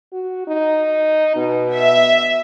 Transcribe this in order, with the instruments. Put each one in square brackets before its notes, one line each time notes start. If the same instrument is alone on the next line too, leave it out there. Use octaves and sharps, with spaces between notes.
[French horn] F#4
D#4
B2
[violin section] E5